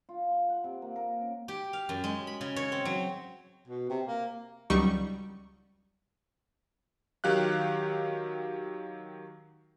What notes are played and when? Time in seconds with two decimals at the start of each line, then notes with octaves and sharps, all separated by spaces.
0.09 F4
0.31 C6
0.49 F#5
0.64 C3
0.82 A#3
0.96 A#4
1.08 G#5
1.21 C#4
1.48 G4
1.73 F5
1.89 F#2
2.04 G#3
2.27 B5
2.41 C#3
2.56 C#5
2.72 C4
2.85 F#3
3.68 B2
3.90 C3
4.07 A#3
4.70 C#2 F#3 G3 D#4 C#6
7.24 D#3 F#3 G4 F5 F#6